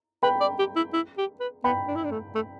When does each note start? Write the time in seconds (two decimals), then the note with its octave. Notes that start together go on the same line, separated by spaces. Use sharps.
0.23 B4 G5 B5
0.41 D5
0.59 G4
0.76 E4
0.93 E4
1.18 G4
1.40 B4
1.64 B3 G5 B5
1.88 D4
1.95 E4
2.04 D4
2.11 A3
2.35 A3